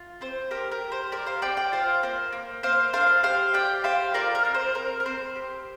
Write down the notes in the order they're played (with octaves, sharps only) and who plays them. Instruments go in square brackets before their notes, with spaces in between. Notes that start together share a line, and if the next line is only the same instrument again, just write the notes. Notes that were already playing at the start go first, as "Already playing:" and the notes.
Already playing: [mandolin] F4
C4 C5
G4 A#4
A#4
G4
C5
G4 A#4 D5
C5 F5
C4 D5 G5
D5 G5
F4 C5 F5
A#3 C5
A#3
A#3 C5 F5
D4 C5 F5
G4 C5 F5
G4 D5 G5
G4 C5 F5
F4 A#4 D5
A#4
C4
C5
C4 A#4
A#4
C4 C5
G4